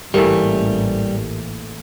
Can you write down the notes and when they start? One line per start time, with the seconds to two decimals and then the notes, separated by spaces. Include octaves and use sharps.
0.14 A1 G#2 E3 G3 A3 A#3 G4 A#4